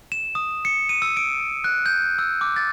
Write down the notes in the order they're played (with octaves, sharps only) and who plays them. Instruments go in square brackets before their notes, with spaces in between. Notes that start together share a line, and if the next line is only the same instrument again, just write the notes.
[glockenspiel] E7
D#6
C#7
D#7
E6
D7
F#6
G6
E6
D6
A6